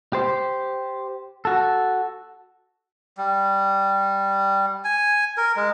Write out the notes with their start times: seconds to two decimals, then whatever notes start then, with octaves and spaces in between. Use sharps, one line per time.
0.13 G4 C5
1.45 F#4 A4
3.18 G3
4.84 G#5
5.37 A#4
5.56 G#3